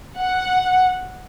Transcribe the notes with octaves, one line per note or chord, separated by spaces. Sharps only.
F#5